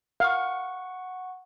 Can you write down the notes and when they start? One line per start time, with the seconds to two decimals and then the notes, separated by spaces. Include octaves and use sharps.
0.20 F5 F#5 C#6